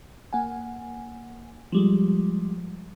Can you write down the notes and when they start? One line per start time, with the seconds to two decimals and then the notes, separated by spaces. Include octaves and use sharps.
0.33 A#3 F#5 G#5
1.72 F3 G3 G#3